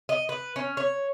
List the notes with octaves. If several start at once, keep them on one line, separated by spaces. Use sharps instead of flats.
D#5
B4
C#4
C#5